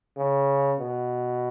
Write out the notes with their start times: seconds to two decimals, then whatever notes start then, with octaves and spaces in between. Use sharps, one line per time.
0.18 C#3
0.80 B2